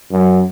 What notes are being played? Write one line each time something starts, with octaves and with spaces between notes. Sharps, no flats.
F#2